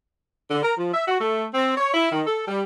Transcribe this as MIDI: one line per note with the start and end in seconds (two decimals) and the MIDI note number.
0.51 0.62 50
0.63 0.72 70
0.77 0.92 53
0.94 1.05 76
1.07 1.18 66
1.21 1.46 57
1.54 1.74 60
1.77 1.92 73
1.94 2.09 64
2.12 2.22 51
2.27 2.44 69
2.48 2.62 55